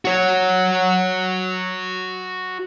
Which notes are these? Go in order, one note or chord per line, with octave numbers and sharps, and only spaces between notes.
F#4 C#5